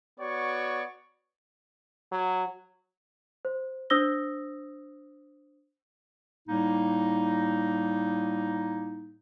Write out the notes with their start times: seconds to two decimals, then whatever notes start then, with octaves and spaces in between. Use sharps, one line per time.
0.20 B3 F#4 C#5 D5 C#6
2.12 F#3
3.45 C5
3.90 D4 C5 D#6 E6 A#6 G7
6.48 A2 G3 A#3 D#4